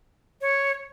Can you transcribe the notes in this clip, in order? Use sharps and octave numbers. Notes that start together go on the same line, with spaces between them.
C#5